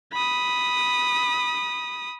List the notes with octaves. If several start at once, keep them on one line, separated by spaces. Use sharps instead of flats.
B5 D#6